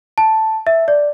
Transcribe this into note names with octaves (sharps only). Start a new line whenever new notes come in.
A5
E5
D5